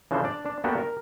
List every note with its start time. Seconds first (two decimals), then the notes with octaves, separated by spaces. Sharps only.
0.11 C#3 E3 F3 D4 A4 C5
0.24 D4 D5
0.46 D4
0.64 A#3 B3 D4 F#4 G4 A4
0.78 A#4